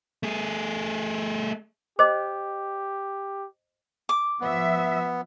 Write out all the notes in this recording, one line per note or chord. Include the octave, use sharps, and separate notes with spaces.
A3 G#4
G4 C5 D#5 D6
D6
F3 B3 E5